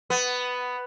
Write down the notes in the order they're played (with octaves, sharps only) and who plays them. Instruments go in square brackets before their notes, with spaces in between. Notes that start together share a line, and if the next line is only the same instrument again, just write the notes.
[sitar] B3